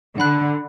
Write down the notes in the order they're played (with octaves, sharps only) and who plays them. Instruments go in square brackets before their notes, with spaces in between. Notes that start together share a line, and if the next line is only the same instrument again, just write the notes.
[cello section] D3 [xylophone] F#5 B5 F#6